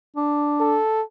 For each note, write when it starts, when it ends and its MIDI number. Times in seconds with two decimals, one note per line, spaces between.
0.16 0.79 62
0.61 1.02 69